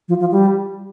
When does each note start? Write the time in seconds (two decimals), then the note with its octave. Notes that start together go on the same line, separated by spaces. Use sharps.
0.09 F3
0.20 F3
0.32 G3